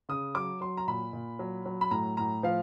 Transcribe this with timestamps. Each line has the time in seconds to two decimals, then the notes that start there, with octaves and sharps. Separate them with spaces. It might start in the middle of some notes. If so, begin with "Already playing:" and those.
0.09 C#3 D#6
0.35 F#3 D6
0.61 F#3 C6
0.77 A#5
0.88 A#2 B5
1.13 A#2
1.39 F#3
1.66 F#3
1.81 B5
1.91 A2 A#5
2.17 A2 A#5
2.43 F3 F5